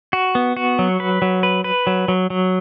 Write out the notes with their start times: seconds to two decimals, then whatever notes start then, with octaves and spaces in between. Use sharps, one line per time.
0.13 F#4
0.35 B3
0.57 F#4
0.79 F#3
1.00 B4
1.22 F#3
1.43 B4
1.64 B4
1.87 F#3
2.08 F#3
2.30 F#3